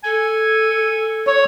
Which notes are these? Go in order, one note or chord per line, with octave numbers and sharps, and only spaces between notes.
A4 G#5
C#5